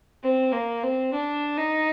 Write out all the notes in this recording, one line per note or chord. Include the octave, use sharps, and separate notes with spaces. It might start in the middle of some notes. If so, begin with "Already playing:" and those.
C4
A#3
C4
D4
D#4